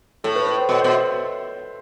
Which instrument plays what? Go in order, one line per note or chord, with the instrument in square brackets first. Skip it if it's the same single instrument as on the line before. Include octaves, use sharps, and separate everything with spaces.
[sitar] A2 [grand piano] A4
[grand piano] B4
B4
C5
[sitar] B2 [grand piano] C#5
[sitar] B2 [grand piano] C5
[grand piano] E5